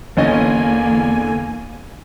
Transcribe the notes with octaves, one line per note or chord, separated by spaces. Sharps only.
A1 E2 D3 A#3 C#4 D#5 G#5